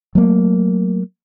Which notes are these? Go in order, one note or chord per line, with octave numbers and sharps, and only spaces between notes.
F#3 A3 A#3